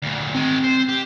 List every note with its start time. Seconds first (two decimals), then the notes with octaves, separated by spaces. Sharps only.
0.02 D2 A#2
0.35 D#3 G#3 C4
0.64 C5
0.89 G4